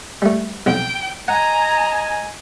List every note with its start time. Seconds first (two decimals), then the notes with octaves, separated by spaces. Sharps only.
0.22 G3 A3
0.66 B1 F2 G5
1.28 D#5 F#5 G#5 A#5